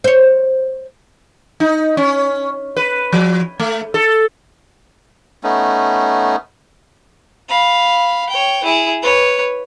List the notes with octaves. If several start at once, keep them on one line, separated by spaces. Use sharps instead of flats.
C5 C#5
D#4
C#4
B4
F3
A3
A4
A3 B3 C#4 D#4
F5 B5
C#5 G5
E4 G#4
B4 C#5